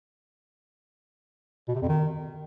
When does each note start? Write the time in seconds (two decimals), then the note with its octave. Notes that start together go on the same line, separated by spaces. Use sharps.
1.68 B2
1.75 C3
1.82 F2
1.89 D#3